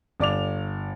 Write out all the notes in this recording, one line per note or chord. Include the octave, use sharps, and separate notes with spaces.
G1 D5 D6 F7